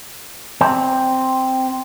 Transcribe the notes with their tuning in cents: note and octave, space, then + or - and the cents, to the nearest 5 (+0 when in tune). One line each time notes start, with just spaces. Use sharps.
C4 +0